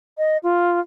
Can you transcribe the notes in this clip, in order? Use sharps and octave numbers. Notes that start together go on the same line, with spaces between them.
D#5
F4